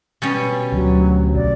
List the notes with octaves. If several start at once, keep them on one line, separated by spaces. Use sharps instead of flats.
B2 G3 C#4
D2 F#3
B1 D5